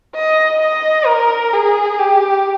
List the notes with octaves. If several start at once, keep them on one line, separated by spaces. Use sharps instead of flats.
D#5
D#5
A#4
G#4
G4